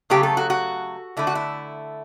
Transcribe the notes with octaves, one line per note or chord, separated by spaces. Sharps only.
C#3 F#3 A3 G4
A4
F#4
F#4
D3 A3 E4
F#4
E4